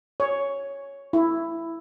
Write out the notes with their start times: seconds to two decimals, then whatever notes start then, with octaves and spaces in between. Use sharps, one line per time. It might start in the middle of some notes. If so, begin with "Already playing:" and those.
0.20 C#5
1.13 E4